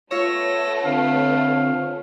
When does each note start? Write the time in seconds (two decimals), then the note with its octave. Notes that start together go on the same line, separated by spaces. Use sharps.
0.11 A3 B3 F4 C#5 E6 A#6
0.84 D3 C4 F5